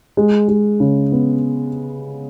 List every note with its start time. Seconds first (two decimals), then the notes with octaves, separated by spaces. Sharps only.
0.17 G#3
0.48 G#3
0.80 C#3
1.12 B3